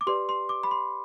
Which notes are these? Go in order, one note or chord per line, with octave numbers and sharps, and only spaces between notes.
D6
G4 B4 D5 C6
C6
D6
B5
C6